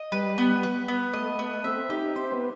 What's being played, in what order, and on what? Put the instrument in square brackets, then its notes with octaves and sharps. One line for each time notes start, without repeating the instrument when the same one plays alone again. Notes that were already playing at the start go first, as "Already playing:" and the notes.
Already playing: [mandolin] D#5
[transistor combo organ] G3 [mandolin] B4
[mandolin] B3
B4
B3
[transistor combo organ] A3 [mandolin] D#5
[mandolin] B3
[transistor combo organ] C4 [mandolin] E5
[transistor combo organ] D#4 [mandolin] G4
[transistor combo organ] C4 [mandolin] C5
[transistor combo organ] B3